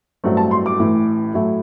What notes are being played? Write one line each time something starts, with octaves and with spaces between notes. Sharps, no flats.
A1 G2 F#3 A3 C4
A5
C6
D6
A1 A2 E3 A3
A2 F#3 A3 E4